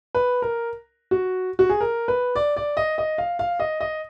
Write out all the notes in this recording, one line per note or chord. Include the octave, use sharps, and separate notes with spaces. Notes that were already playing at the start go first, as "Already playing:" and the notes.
B4
A#4
F#4
F#4
G#4
A#4
B4
D5
D5
D#5
D#5
F5
F5
D#5
D#5